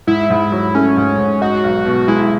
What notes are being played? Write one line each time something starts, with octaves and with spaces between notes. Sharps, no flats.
G#2 E4
G#2
F#3
A3 C#4
G#2
G#2
D#4 F#4
B1
B2
G#3 E4